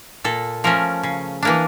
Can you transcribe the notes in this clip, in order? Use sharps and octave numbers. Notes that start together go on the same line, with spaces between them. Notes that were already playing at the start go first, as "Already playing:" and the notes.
A#2 A4
F3 A3 C#4 A#4
C#3
E3 A#3 D4